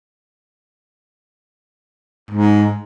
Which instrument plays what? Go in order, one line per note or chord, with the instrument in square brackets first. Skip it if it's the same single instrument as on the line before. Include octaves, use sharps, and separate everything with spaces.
[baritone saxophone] G#2